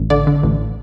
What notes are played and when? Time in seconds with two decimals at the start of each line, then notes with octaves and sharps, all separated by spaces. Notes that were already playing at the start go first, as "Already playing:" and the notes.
Already playing: A1
0.10 D3 D5
0.27 D3
0.43 A1